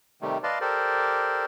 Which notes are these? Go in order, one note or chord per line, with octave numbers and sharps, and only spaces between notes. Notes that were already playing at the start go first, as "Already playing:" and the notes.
C3 D#3 G3 A3
B4 D5 D#5 F5 A5 C6
G4 A4 A#4 C5 D5